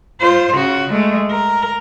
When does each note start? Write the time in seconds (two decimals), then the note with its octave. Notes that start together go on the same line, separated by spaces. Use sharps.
0.21 F4 C5
0.55 C#3 F#4
0.90 G#3 A3
1.31 A#4